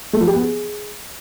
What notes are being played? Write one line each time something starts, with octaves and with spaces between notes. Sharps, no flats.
A3
F3
G4
B3
G#4